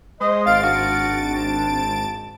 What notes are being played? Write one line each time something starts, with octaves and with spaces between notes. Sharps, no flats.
G#3 C5 D#5 D#6
G#1 F5 F6 A6 D7
D4 F#4
C4 A5